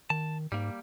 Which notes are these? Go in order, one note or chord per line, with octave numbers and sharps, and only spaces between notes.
D#3 A5
G#2 G3 A#3